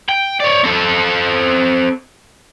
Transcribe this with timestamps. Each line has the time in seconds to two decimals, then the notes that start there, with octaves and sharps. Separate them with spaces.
0.09 G5
0.40 C#5 D5
0.64 C4 A4